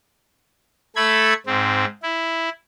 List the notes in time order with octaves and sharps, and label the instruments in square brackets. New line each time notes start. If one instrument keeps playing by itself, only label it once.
[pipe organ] A3 A4 B5 G#6
G#2 C4
E4